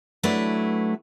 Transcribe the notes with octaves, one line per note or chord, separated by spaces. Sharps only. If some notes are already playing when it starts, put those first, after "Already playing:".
F#3 A3 D4 E4 B4